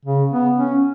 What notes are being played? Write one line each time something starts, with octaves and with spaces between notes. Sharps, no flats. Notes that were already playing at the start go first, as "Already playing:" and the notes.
C#3
B3
C#4